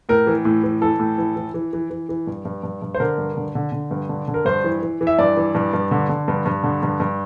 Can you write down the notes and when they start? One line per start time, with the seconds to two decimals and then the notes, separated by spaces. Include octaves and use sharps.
0.09 A2 A#4
0.27 E3
0.45 A2
0.64 E3
0.81 E3 A4
0.99 A2
1.18 E3
1.36 E3
1.54 E3
1.73 E3
1.90 E3
2.09 E3
2.27 G2
2.45 G2
2.63 G2
2.82 G2
2.95 C5
3.00 D3 A#4
3.18 G2
3.37 D3
3.55 D3
3.72 D3
3.91 G2
4.09 D3
4.28 D3
4.34 A#4
4.45 G2 C5
4.64 E3
4.82 E3
5.01 E3
5.07 E5
5.18 G2 D5
5.37 E3
5.55 G2
5.73 G2
5.91 D3
6.09 D3
6.28 G2
6.46 G2
6.63 D3
6.83 G2
7.00 G2